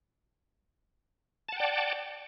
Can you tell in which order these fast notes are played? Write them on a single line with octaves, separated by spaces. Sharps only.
A5 F#5 G5 D5